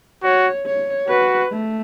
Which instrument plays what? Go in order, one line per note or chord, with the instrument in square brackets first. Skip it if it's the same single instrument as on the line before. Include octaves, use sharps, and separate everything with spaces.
[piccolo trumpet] F#4 [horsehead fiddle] C#5
[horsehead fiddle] C#5
[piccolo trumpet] F#4 [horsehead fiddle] B4
[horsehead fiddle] A3